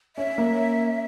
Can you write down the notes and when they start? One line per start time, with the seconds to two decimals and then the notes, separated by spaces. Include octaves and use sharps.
0.16 C#4 E5
0.38 A#3 C#4